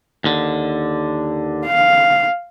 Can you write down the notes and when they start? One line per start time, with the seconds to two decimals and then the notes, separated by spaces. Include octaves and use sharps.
0.24 D#2 D3
1.66 F5